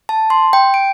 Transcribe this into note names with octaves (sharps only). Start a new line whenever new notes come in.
A5
C6
G5
D7